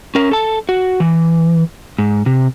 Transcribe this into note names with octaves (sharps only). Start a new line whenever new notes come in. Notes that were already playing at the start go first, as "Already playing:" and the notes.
C#4 A#4
A4 A5
F#4
E3
G#2
C3